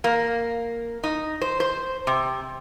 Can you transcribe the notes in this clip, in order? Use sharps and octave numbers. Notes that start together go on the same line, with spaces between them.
A#3
D#4
C5
C5
C3